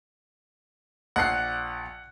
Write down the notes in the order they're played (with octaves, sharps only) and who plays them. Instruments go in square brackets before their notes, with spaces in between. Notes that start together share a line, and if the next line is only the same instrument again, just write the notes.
[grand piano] A#1 C7 [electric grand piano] F#5 F#6